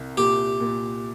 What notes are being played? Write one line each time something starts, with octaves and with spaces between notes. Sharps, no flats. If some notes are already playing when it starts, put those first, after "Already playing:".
Already playing: C2
A#2 G4
A#2